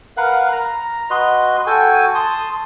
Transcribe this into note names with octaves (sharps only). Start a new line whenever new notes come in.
A#4 B4 F5 F#5
A#5
F#4 B4 D#5 C6
F#4 A4 G5 G#5
A5 C6 D#6